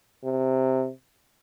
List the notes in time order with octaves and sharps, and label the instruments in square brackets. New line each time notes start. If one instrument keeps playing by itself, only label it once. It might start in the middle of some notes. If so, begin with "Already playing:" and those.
[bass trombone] C3